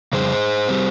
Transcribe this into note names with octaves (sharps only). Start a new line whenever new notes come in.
F2 C#3 G3 G#4 C5
G3 C4